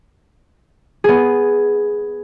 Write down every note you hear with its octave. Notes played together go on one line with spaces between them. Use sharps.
B3 G#4